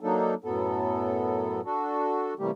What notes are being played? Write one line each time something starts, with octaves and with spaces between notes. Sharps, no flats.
F#3 A#3 D4 D#4 A4
F#2 A2 F#3 B3 A4
D4 F#4 A4
C3 E3 G3 A3 A#3 G4